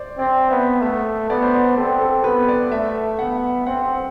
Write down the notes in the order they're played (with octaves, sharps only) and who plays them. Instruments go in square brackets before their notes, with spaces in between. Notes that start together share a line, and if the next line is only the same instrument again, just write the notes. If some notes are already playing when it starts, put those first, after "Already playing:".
Already playing: [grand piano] C5 D5
[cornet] C4 [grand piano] D5
[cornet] B3 [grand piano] E5
[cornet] A3 [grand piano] E5
[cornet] B3 [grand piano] D5
[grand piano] C5
D5
[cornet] C4 [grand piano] A4
[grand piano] A4
[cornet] B3 [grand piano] B4
[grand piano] D5
[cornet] A3 [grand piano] E5
[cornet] B3 [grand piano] F#5
[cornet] C4 [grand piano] F#5